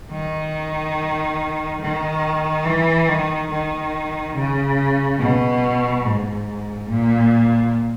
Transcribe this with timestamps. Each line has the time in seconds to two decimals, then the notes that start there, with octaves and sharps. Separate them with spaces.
0.12 D#3
1.81 D#3
2.65 E3
3.09 D#3
3.51 D#3
4.36 C#3
5.19 B2
6.05 G#2
6.89 A#2